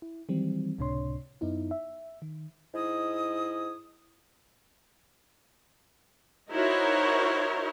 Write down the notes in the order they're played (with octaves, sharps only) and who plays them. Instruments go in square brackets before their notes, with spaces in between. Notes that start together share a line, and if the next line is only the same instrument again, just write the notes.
[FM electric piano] E4
D#3 E3 F#3 G3 C4
C#2 A2 C3 D4 C#5 C6
F#2 B3 D#4 E4
E5
D#3
[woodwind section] G#2 E4 D#5 D#6
[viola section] D#4 E4 F#4 A#4 C5 C#5